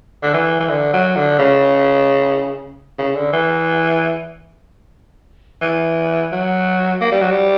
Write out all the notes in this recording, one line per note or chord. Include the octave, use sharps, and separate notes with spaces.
D3
E3
E3
D3
F#3
D3
C#3
C#3
D3
E3
E3
F#3
A#3
G3
F#3
G3